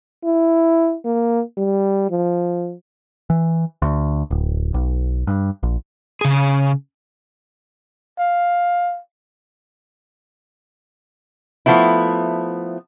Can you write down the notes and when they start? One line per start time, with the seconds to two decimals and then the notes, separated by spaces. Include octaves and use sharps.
0.25 E4
1.05 A#3
1.58 G3
2.10 F3
3.30 E3
3.82 D2
4.31 D1
4.74 B1
5.27 G2
5.63 A#1
6.21 C#3 G#4
8.19 F5
11.66 F3 A3 B3 E4